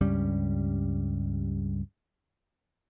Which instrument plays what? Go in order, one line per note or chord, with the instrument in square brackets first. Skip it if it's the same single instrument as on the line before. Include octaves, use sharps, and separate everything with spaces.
[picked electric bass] C#2 G2 G3 C#4